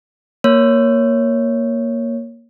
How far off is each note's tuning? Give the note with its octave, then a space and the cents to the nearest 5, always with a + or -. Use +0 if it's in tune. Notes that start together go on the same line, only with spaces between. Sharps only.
A#3 +0 C#5 +0